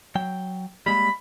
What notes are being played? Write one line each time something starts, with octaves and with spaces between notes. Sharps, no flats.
F#3 G5
G3 G#3 A#3 B5